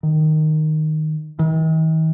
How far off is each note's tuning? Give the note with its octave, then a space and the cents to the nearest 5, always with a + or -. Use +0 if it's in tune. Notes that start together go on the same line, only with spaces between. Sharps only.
D#3 -5
D#3 +45